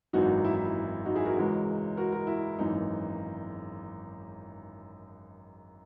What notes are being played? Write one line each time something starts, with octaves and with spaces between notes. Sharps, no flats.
G#1 F#2 E3 D#4 F#4
E4
E4
E4
D#4 F#4
E4 G#4
F#4 A#4
C#2 C#3 E3 G#3
F#4 A#4
F#4 A#4
E4
G#1 F#2 E3 D#4